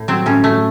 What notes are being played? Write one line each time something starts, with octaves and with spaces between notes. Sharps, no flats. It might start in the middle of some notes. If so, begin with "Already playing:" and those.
Already playing: A2
F#3 C4
A2 C#4
A3